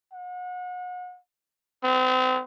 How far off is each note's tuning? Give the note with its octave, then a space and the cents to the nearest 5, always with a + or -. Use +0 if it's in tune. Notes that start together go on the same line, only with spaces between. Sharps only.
F#5 -35
C4 -35